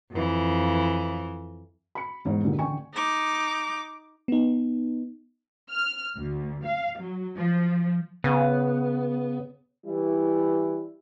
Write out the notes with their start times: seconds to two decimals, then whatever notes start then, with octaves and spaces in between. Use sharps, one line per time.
0.12 F2 E3
1.95 B5 C#7
2.25 E2 G#2 C5 C#5
2.43 D2 G2 A#2 D3 D#3
2.59 A1 D3 G5 G#5 C#6
2.94 D#4 D6
4.28 B3 D#4
5.72 F6
6.16 D2
6.64 F5
6.98 F#3
7.37 F3
8.24 C#3 B3
9.86 E3 G3 E4